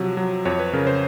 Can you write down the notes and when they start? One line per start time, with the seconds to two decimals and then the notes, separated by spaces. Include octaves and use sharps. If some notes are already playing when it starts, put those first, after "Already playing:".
Already playing: C3 F3 F#3
0.17 F#3
0.45 F2 C#5
0.59 B4
0.73 C#3 A#4
0.87 C5